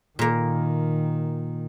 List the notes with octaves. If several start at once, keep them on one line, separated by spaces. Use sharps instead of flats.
A#2 D#3 A#3